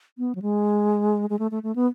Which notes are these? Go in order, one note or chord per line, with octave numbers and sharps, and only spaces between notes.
B3
F#3
G#3
G#3
A3
A3
A3
B3